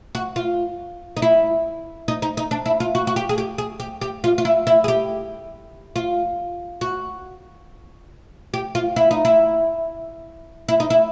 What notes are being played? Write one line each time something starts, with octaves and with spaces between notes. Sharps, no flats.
F#4
F4
D#4
E4
D#4
D#4
D#4
D4
E4
F4
F#4
F#4
G4
G#4
G4
G#4
G4
G4
F4
F4
E4
E4
G#4
G4
F4
F#4
G4
F4
E4
D#4
E4
E4
D#4
E4